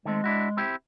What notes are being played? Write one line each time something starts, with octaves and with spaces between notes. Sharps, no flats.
D#3 G#3 A3 C4
D4 E4 F#4
C4 E4 G4